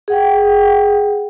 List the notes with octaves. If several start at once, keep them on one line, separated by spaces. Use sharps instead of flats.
G#4 F#5 G5